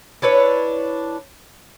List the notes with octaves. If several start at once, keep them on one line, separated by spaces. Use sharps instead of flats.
D4 E4 B4 C#5